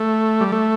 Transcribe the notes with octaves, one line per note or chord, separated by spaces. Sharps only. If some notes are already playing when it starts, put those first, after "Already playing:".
Already playing: A3
G3
A3